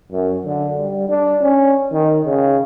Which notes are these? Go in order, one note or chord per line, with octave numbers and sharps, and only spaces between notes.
F#2
D3
G3
D4
C#4
D#3
C#3